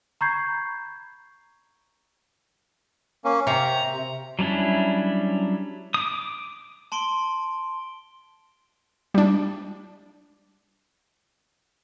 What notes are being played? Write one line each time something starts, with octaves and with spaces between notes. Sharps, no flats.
A#5 B5 C#6 G6 G#6 C7
A#3 C#4
C3 A#5
F#3 G3 C#4 D4 E4
D6 D#6
A5 C6 D7 G7
G3 D4